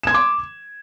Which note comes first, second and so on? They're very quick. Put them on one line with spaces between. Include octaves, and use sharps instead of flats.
E7 G#6 C6 D6